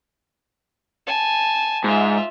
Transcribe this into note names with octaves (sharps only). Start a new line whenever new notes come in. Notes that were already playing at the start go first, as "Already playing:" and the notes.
G#5 A5
G#2 F4 E5